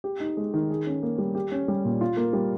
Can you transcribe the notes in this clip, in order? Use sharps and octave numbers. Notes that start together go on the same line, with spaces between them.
G4
D#4
G#3
D#3
G#4
C#4
A#3
G3
G4
C#4
G3
A#2
F4
A#3
G3